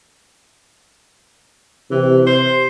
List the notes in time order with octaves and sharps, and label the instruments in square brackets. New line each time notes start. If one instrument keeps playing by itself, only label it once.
[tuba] C3 [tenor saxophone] E3
[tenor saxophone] C5